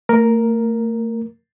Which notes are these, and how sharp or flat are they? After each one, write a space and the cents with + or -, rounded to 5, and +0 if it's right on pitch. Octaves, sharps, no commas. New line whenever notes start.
A3 +40 A#4 +0